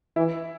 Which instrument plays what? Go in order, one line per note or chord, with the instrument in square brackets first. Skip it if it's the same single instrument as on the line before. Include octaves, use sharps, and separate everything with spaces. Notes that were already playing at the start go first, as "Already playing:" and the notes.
[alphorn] E3 [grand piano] E4